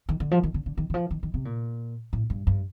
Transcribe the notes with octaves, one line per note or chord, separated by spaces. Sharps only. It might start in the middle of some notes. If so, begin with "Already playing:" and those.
D#3
D3
F3
D#3
D3
D3
D#3
D#3
F3
D#3
D#3
C3
A#2
A2
G2
G2